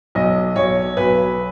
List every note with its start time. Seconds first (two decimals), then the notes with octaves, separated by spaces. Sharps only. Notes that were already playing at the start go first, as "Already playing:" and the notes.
0.15 B1 D#5
0.56 B1 C#5
0.97 B1 B4